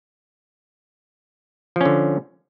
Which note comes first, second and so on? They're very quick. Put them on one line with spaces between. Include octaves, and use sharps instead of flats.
F3 C#4 D3